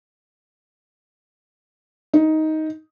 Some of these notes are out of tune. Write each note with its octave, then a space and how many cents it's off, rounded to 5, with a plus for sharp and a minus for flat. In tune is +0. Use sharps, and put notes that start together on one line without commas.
D#4 +10